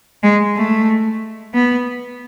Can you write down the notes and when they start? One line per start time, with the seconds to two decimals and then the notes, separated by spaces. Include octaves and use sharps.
0.23 G#3
0.56 A3
1.54 B3